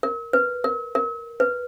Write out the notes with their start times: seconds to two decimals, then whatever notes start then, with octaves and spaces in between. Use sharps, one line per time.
0.03 A#4
0.33 B4
0.64 A#4
0.95 A#4
1.40 B4